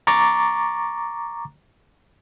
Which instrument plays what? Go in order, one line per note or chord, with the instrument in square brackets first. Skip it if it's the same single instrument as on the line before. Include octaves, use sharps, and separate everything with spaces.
[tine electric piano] A#5 C#6 D6 A6